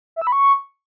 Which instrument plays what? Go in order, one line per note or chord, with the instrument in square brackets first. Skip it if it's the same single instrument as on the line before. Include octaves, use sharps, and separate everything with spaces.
[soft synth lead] E5
E6
B5
C#6